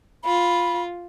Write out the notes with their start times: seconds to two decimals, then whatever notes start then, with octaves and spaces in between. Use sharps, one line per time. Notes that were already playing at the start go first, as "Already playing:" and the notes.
0.24 F4 B5